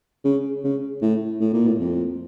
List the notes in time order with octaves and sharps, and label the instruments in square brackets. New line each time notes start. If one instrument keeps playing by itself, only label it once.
[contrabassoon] C#3
C#3
A2
A2
A#2
A2
F2